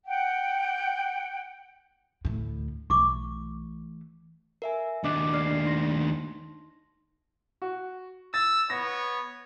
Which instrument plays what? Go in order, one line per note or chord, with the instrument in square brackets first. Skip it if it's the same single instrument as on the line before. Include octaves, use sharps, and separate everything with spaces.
[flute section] F#5 G5
[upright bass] D2 A2
[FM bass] B1 [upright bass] E3 A3 [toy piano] C#6 D6
[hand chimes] A#4 E5 G#5
[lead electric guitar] D#2 D4 [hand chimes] D#5 D6 F#6
[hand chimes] D5 F6 C7
D#4 C6 A#6
[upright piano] F#4
[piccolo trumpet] E6 [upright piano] A6
[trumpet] B3 [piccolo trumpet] C#5 [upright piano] A#6